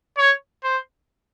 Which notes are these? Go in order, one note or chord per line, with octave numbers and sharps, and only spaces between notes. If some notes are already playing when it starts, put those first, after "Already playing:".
C#5
C5